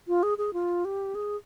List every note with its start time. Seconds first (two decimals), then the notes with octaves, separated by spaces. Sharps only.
0.08 F4
0.23 G#4
0.38 G#4
0.53 F4
0.85 G4
1.15 G#4